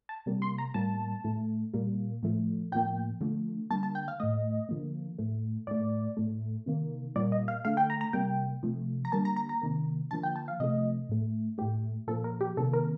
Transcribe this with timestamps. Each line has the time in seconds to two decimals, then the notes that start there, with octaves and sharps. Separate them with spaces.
0.09 A5
0.26 C3 G3 A#3
0.42 C6
0.58 A#5
0.74 A2 G3 A#3 A5
1.24 A2 A3
1.73 A#2 G3 A#3
2.23 A2 F3 A3
2.72 A2 F3 A#3 G5
3.21 D3 F3 A3
3.70 D3 G3 A#3 A5
3.83 A5
3.95 G5
4.08 F5
4.20 A2 A3 D#5
4.69 D3 F3 A#3
5.18 A2 A3
5.67 A2 A3 D5
6.17 A2 A3
6.66 C3 D#3 A#3
7.16 A#2 G3 A#3 D5
7.32 D#5
7.48 F5
7.65 D3 A3 F5
7.77 G5
7.90 A#5
8.01 A#5
8.13 C3 G3 A#3 G5
8.63 C3 F3 A3
9.05 A#5
9.12 D3 G3 A#3 A5
9.25 A#5
9.36 A#5
9.49 A#5
9.62 C3 D#3 A#3
10.11 D3 F3 A#3 A5
10.23 G5
10.36 A5
10.48 F5
10.60 C3 F3 A3 D#5
11.09 A2 A3
11.58 A2 A3 G4
12.07 A#2 F3 A#3 A4
12.24 A#4
12.41 G4
12.57 C3 D#3 A#3 A4
12.73 A#4